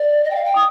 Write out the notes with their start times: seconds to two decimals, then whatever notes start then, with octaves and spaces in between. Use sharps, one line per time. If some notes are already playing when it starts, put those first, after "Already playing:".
Already playing: D5
0.24 D#5
0.30 G5
0.35 F5
0.45 G5
0.55 D#6